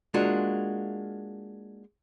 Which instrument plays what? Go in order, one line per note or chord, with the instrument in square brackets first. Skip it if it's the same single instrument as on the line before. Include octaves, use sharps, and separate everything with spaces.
[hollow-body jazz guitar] G#3 A#3 D4 F4 F#4